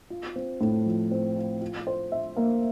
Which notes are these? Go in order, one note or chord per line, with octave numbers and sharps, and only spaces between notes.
F4
C4
A2
F3
C4
F4
F4
C5
E5
A#3